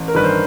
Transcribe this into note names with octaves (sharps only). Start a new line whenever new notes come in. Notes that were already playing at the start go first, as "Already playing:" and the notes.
Already playing: A1
A#4
G2 D#3 B4
C5